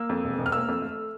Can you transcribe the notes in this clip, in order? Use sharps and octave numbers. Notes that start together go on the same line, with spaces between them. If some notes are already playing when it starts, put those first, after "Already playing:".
Already playing: A#3 E6
F2
E1
E1
F6
A#3 E6
F2
A3